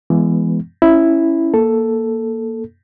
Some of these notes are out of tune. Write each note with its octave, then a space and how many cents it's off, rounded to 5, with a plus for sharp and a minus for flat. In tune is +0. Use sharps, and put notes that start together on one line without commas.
E3 +20 G#3 +0 B3 +0
C#4 -5 E4 +0
A#3 +0 A4 +0